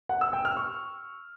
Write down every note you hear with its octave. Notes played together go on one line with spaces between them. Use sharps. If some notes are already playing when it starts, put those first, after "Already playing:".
F#5
E6
G5
F6
C#6